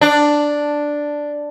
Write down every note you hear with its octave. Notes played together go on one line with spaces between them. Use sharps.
D4